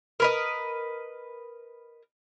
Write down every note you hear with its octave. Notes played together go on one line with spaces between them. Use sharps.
A#4 B4 D#5